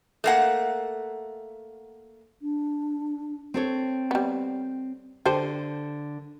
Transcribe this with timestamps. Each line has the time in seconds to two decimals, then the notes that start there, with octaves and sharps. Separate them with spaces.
0.24 A3 A#3 F#5
2.42 D4
3.54 C4 A4 C#5
4.11 G3 B3
5.26 D3 G4 A4 C5